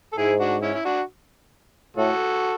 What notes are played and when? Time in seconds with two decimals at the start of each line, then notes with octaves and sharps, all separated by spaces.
0.13 A4
0.17 G#2 E4 G#4
0.40 D4 F#4
0.62 C#4 E4
0.75 E4
0.84 D4 F#4
1.96 A2 F#4 A4